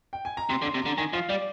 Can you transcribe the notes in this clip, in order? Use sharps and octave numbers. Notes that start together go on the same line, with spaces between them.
G5
G#5
A#5
C3 C6
D3
C6
C3
D3 A#5
D#3 G#5
F3 F5
G3 D5